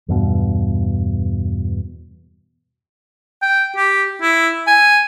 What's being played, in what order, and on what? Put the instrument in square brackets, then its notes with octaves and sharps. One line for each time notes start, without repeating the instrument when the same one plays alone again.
[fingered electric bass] E2 G2 B2
[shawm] G5
G4
E4
G#5